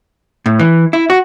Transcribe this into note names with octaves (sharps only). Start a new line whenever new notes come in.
A2
E3
E4
F#4